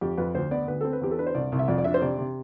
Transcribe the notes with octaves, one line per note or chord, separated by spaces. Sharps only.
F2 G4
F2 B4
D2 C5
B3 D5
D2 B4
C4 A4
B4
E2 G4
A4
D4 B4
C5
C2 D5
C2
E5
F2 D5
D5
D4 E5
C5
C3 D5
C3